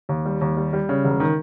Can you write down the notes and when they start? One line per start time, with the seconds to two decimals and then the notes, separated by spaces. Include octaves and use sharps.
0.09 D#2
0.26 G3
0.41 D#2
0.57 G3
0.73 G3
0.89 C#3
1.05 E1
1.20 D#3